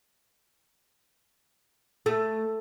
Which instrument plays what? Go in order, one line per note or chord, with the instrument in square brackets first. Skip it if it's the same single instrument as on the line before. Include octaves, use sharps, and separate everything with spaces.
[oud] A3